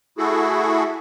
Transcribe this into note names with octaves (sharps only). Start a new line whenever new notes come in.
A3 E4 F#4 G#4 A4